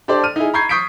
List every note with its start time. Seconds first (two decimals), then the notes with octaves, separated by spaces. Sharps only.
0.08 D4 G4 A4 C5 D5
0.24 F6 D#7
0.36 D#4 E4 G#4
0.54 A#5 B5 C#6 G6 G#6 C7
0.69 C#6 D#6 G6 B6 C7 D7